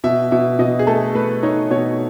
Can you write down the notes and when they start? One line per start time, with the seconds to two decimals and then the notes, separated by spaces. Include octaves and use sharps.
0.04 B2 E5
0.31 B2 E5
0.59 B2 D#5
0.79 G#4
0.87 A3 A4
1.15 A3 B4
1.43 D#4 C#5
1.71 B2 C#5